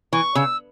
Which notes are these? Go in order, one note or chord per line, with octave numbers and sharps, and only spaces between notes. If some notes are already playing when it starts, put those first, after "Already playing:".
E3 C#6
C#3 E6